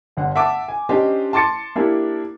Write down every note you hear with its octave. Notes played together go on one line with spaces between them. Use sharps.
G1 D3 F#5
E5 F#5 A5 D6
G#5
C#4 D4 G4 C5 D#5
A5 C6 D6 A6 C#7
A#3 D4 E4 G4